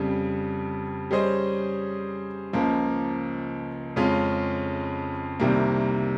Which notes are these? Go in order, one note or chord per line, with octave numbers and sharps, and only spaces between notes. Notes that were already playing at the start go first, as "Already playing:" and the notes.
Already playing: F2 C#3 G3
G3 C#4 G#4 C5 D#5
C#2 C#3 F3 A#3
F2 C#3 G#3 C#4 F4
C2 C3 D#3 G3 A#3